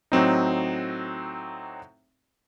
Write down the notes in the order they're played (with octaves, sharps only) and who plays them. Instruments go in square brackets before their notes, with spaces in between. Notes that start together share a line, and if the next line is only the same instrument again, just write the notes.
[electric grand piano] A2 F#3 C4 D#4